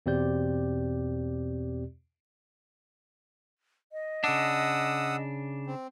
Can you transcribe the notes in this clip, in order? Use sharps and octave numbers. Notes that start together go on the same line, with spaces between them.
E2 B2 C4 G4 D5 G6
D#5
C#3 D4 F#5 D#6 E6
C4